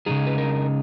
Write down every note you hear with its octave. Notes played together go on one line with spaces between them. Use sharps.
C#3 F3 G#3 D#4 G#4
B4
A#4